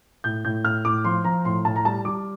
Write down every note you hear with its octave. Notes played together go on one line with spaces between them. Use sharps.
A2 G6
A2 G6
A2 F6
A2 D6
F3 C6
F3 A#5
A2 C6
A2 A5
A#5
G3 A5
G3 D6